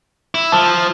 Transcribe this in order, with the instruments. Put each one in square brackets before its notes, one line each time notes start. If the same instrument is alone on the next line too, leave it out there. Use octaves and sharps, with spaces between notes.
[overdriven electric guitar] E4
[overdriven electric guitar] F3 [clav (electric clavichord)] A5